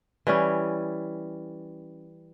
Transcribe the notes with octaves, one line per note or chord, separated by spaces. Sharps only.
E3 G3 C#4